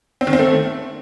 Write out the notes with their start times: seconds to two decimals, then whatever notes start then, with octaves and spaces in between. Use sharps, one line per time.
0.21 C4
0.27 D#3
0.33 C4
0.39 A3